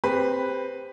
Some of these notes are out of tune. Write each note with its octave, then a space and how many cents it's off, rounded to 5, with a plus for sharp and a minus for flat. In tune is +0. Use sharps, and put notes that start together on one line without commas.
C4 +0 G4 +25 B4 +0